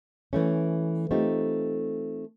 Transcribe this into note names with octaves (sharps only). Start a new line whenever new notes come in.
E3 A3 C#4
A3 C4 D#4 F4 G4